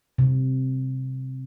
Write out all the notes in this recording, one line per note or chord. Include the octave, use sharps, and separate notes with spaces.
C3